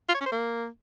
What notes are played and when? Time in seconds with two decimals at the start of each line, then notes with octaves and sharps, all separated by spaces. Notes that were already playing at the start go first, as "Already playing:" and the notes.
0.09 F4
0.15 C#5
0.21 C#4
0.26 C5
0.32 A#3